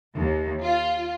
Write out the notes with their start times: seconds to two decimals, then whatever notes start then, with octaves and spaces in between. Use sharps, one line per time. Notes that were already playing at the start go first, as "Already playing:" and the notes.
0.15 D#2
0.63 F4